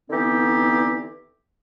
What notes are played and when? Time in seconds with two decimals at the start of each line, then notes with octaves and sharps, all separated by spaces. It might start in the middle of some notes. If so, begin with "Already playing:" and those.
0.10 D3 E3 B3 C4 D#4 G4